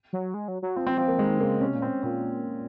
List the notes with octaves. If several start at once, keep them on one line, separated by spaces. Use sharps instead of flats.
F#3
G#3
F#3
F#3
F3 C4
C4
F3 C4
A#3
D#3 G#3
C#3 A#3
C3 C#4
A#2
C4
A#2 C4